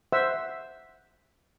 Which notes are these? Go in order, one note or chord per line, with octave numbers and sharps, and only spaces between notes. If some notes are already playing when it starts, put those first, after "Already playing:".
C5 E5 F#5 E6